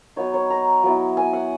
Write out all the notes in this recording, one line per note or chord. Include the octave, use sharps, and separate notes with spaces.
F#3 B3 D#4 C#5
C#5
A#5
F#3 B3 E4
G#5
F#5